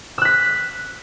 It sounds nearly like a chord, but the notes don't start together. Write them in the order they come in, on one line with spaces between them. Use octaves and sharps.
E6 F#6 B6